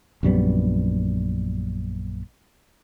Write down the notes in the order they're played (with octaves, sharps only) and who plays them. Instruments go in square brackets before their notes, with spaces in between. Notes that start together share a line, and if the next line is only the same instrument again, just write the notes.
[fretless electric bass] A#1 F#2 G3 B3